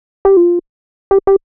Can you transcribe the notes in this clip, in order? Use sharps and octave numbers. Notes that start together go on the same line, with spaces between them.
G4
F4
G4
G4